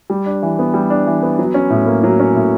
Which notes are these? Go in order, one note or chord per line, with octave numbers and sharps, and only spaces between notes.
G3
D4
E3
B3
G3
D4
E3
B3
F#3
C#4
A2
A#3
F#3
C#4
A2